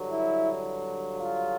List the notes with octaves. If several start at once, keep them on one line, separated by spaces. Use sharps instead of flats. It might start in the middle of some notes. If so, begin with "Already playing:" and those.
Already playing: G2 D3 F#3
E4
F4